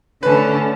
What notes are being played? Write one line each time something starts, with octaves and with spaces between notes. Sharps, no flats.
D3 A3 C#4 B4